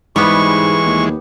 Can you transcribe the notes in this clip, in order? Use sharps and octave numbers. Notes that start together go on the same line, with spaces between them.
G#2 E3 G3 G#3 B3 C#6
D#2